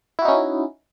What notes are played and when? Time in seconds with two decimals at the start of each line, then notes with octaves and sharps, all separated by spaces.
0.19 E4
0.22 F#4
0.25 D#4
0.28 C#4